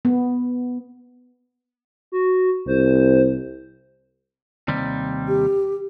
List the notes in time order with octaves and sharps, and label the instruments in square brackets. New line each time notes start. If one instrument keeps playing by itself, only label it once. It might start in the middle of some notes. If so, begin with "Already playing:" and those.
[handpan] B3
[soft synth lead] F#4
[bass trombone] C2 [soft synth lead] C5
[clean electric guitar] D#2 C3 G3
[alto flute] G4